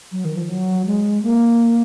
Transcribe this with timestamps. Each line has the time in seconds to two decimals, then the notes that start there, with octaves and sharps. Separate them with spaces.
0.12 F#3
0.25 D#3
0.37 F3
0.49 F#3
0.86 G#3
1.23 A#3